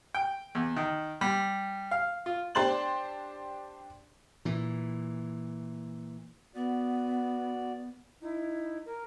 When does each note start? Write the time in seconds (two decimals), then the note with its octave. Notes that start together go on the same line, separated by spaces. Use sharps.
0.15 G5
0.55 E2
0.76 D#3
1.21 G3
1.91 F5
2.26 F4
2.55 D4 G4 C5 C6 A6 F#7
4.45 A#2 E3
6.55 B3 F#4 D5
8.22 D#4 E4
8.86 A#4